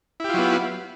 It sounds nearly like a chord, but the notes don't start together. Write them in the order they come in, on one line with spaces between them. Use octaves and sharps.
E4 G4 F4 F#3 B3